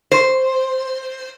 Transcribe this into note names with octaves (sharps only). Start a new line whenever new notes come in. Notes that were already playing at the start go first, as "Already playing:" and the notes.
C5